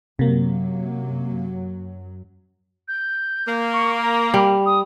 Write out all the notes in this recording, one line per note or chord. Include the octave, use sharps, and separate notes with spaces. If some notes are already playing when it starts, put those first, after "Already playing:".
F#2 C3 F#3 A#3
G6
A#3
C#6
A#5
G3
D#6